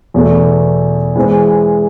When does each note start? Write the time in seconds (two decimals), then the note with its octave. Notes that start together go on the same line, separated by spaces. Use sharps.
0.14 E2 B2 A3
1.16 E3 G#3 C4